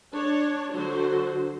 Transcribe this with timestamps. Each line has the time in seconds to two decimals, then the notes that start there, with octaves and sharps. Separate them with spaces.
0.14 D4 C#5
0.74 D3 F#3 F#4 C5